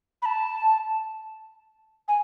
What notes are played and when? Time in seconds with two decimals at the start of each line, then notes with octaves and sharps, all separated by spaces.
0.22 B5
0.25 A5
2.08 G#5